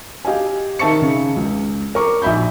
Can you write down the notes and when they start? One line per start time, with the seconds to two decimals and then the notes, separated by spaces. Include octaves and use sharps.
0.25 G4 D#5 F5 G#5
0.79 D#3 D#4 E5 A5 C#6 C#7
1.02 C#3
1.36 C#2
1.95 A#4 C#6 D6
2.22 A#1 D#4 E5 B5 G6